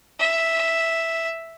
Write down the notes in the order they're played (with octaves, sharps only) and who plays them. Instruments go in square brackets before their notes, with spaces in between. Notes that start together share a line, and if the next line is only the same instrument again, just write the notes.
[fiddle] E5